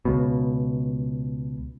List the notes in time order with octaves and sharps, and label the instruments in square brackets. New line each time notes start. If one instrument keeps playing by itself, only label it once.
[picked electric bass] C#2 B2